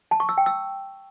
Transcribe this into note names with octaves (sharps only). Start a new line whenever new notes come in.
A5
C#6
E6
G5
E6